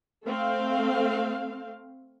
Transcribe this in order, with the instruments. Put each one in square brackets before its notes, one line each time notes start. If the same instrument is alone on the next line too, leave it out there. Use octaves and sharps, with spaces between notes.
[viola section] A3 C4 F5